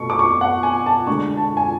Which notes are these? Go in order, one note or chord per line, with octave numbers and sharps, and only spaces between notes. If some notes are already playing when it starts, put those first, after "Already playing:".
Already playing: B2 A3 C#6
D6
C#6
F#5
G#5
A5
D3 G#3 D4 C#6
A5
G#5